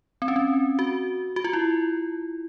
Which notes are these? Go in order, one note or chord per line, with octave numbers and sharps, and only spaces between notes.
C4
C#4
C4
F#4
F#4
F4
E4